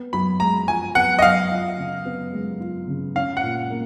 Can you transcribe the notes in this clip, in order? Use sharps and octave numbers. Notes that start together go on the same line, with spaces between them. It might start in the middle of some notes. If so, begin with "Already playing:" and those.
Already playing: B3
F#2 B5
G#3 A#5
F3 G#5
B3 F#5
D#5
F#2 F5
F4
C#3
B3
G#3
F4
C#3
C#4 F5
F#5
A#2
A#3